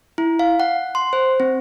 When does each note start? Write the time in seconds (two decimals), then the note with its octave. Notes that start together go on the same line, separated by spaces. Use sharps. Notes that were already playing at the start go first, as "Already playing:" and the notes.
0.18 E4
0.39 F5
0.60 F#5
0.95 C6
1.13 C5
1.40 C4